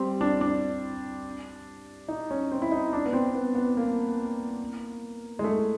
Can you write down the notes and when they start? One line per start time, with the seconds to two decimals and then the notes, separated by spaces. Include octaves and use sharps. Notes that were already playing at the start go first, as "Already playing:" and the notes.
Already playing: G3 C4
0.21 D4
0.41 D4
2.09 D#4
2.31 C#4
2.52 C4
2.62 E4
2.72 D#4
2.93 D4
3.06 B3
3.13 C4
3.35 B3
3.55 B3
3.77 A#3
5.39 G#3
5.44 A3